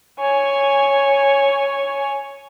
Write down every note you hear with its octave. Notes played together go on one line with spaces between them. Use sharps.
C#5 G#5